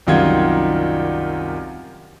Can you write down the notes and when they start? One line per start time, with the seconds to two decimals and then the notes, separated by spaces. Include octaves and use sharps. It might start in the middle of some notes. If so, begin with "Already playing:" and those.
0.07 C2 F#2 D#3 F4 F#5 G#6